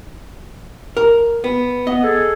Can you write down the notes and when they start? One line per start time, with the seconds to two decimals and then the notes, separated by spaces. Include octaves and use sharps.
0.97 A#4
1.44 B3
1.87 B3 D#5
2.03 G#4 A4